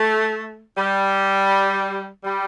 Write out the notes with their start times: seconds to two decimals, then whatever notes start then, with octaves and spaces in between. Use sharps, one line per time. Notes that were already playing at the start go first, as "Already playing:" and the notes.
Already playing: A3
0.77 G3
2.24 G3